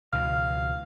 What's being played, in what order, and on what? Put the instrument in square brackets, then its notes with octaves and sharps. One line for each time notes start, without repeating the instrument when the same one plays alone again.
[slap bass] C#2 B2 E3 [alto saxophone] F5 [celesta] F6